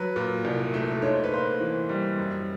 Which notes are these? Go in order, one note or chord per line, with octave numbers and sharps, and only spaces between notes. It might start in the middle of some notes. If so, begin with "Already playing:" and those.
Already playing: F#3 B4
A#2
C2
A3
G#2 C#5
C5
B4
A#3 C5
E3
G3
F#2